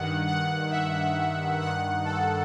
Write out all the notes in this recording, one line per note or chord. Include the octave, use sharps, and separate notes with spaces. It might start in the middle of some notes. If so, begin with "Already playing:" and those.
Already playing: G2 D#3 F#5
F#5
E5
G2 D#3 F#5
A4